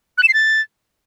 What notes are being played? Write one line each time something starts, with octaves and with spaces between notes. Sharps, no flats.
F#6
E7
C7
A6